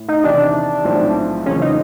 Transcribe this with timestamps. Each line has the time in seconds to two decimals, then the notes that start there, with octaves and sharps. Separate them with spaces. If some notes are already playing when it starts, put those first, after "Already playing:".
Already playing: A2
0.08 D#4
0.24 E2 C3 D#3 D4
0.85 B1 A2 F3 G#3 C4
1.46 F#1 E2 C#3 F3 G#3 C#4
1.61 D#4